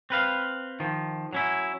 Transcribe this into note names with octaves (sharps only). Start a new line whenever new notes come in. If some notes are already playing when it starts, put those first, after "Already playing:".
C4 B4 F5
D#3 F3
F#3 C#4 E4